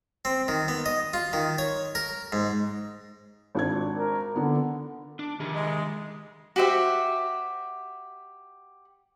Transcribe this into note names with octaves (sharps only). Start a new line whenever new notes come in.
C4
D#3
B3
D#5
F4
D#3
C#5
A#4
G#2
G#1 D4 G#6
A#4
D3 B3 D4
D4
D#3 G4 G#4
G#3
F#4 G4 C5 E5